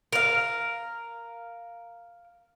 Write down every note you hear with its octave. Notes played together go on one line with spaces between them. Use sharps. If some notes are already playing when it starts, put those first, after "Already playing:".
A#4 F5